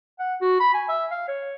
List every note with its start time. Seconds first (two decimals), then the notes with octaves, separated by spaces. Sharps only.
0.19 F#5
0.41 F#4
0.60 B5
0.74 G#5
0.89 E5
1.11 F5
1.28 C#5